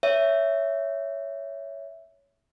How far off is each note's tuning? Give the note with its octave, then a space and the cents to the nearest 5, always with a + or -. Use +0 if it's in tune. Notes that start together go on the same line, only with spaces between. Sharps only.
C#5 +15 E5 +0